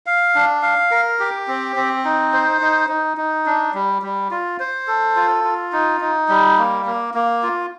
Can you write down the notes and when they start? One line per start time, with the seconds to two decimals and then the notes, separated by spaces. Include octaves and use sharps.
0.06 F5
0.35 D4
0.62 F5
0.91 A#4
1.20 G4
1.48 C4
1.76 C4
2.05 D#4
2.33 C5
2.61 D#4
2.89 D#4
3.17 D#4
3.46 D4
3.74 G3
4.02 G3
4.31 F4
4.60 C5
4.87 A4
5.16 F4
5.44 F4
5.73 D#4
6.01 D#4
6.29 G3
6.58 A#3
6.86 A#3
7.14 A#3
7.43 F4